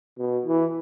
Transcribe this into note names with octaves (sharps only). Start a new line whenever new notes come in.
B2
E3